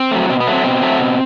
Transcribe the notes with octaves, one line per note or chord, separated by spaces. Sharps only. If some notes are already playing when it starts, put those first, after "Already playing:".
Already playing: C4
F#3 A3
B2 C4
B3
F#3 A3
C4
B2 C4
F#3 A3
B2